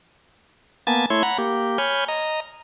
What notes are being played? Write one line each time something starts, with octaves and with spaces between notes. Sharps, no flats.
A#3 B3 G#5 A5 A6
A3 E4 C#5 C6 G#6
F#5 A#5 B5
A#3 G4
C#5 G#5 B5 F6 G6
D#5 A#5